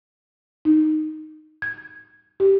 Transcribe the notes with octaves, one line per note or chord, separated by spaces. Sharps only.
D#4
G#6
G4